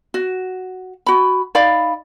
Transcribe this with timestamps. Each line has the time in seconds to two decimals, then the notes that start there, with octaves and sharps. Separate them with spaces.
0.14 F#4
1.06 F#4 B5
1.55 D#4 D5 F5 B5